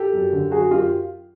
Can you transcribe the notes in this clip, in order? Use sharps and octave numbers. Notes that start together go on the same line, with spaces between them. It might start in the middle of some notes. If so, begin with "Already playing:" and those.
Already playing: G4 A4
F#2
D3
F#3 F#4 G#4
F#2 F4 G4